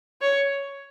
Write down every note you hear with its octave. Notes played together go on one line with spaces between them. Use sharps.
C#5